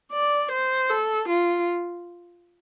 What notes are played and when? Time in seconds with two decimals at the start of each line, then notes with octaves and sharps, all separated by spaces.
0.12 D5
0.52 C5
0.90 A4
1.29 F4